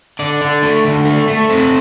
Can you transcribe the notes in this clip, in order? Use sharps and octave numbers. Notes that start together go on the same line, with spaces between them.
D3 D5
D3
A3
D3
A3
A3
C4